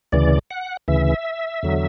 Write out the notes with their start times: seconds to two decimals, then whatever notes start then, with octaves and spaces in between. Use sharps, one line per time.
0.12 D2 C#3 E3 D5
0.51 F#5
0.88 D2 C#3 E3 E5
1.63 E2 D3 F#3